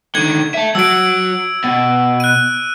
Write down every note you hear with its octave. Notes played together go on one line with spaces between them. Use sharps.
D3 D#3 G#6
E5 A5
F#3 F#4 E6 D7
B2
F#6 D#7